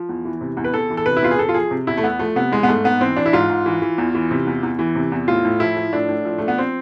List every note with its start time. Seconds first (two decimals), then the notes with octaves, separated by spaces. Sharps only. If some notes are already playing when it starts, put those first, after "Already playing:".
Already playing: F3
0.09 E2
0.25 E3
0.41 C3
0.57 E2
0.64 B4
0.73 E2 A4
0.90 E3
0.97 A4
1.06 C3 B4
1.17 E4
1.23 E2 F4
1.31 G#4
1.39 E2 A4
1.49 F4
1.54 F3 G#4
1.71 C3
1.87 E2 E4
1.98 A3
2.03 E2 B3
2.19 F3 A3
2.36 C3 B3
2.51 E2 G#3
2.63 B3
2.68 G#2 A3
2.84 G#2 B3
3.01 E3 C4
3.17 E3 D4
3.26 E4
3.33 G#2 F4
3.50 G#2
3.66 E3
3.82 E3
3.98 E2
4.15 E3
4.31 C3
4.47 E2
4.63 E2
4.79 E3
4.95 C3
5.12 E2
5.28 A2 F4
5.45 A2
5.60 F3 E4
5.77 F3
5.93 A2 D4
6.09 A2
6.25 F3
6.38 F3 A3
6.48 B3
6.58 C4